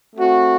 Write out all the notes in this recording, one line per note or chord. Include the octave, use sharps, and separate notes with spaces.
A3 C4 F#4